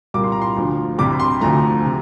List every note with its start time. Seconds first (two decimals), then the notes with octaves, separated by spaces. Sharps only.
0.14 C2 A#2 G3 A#3 D6
0.24 C6
0.32 A#5
0.42 C6
0.57 D2 D3 F3
0.98 C2 C3 G3 D6
1.20 C6
1.41 D2 D3 F3 A3 A#5
1.86 C3